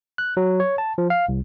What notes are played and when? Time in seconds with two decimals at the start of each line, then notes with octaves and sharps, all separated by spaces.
0.18 F#6
0.37 F#3
0.60 C#5
0.78 A5
0.98 F3
1.10 F5
1.29 C2